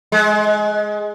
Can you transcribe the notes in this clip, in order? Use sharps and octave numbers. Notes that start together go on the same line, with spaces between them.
G#3